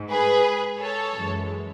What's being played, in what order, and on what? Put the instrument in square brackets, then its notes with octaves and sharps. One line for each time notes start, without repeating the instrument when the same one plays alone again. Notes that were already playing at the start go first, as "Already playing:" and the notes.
Already playing: [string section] G#2
G#4 B4
A4 C#5
F#2 E3 G#3